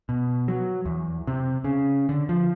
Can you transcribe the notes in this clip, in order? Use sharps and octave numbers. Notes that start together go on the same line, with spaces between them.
B2
F#3
E2
C3
C#3
D3
F3